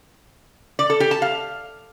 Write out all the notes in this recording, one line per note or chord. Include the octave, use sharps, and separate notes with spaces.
D5
A4
G4
A5
F5